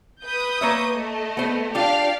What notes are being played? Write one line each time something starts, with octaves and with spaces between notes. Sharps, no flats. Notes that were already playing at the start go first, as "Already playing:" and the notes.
B4 D#6 G6
A#3 C#5 E5
A3 D#5
B3 C5
D4 F4 G4 D5 F5